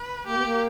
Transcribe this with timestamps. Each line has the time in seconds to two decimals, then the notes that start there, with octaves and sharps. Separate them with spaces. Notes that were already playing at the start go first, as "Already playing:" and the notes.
Already playing: B4
0.27 A#3 G4
0.35 B3
0.43 A#3